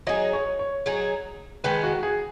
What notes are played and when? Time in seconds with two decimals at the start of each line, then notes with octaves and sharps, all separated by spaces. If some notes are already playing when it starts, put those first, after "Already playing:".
0.07 F#3 D#4 G#4 D#5
0.33 C#5
0.59 C#5
0.86 F#3 D#4 G#4
1.64 D#3 G#3 B3 B4
1.83 F#4
2.03 G#4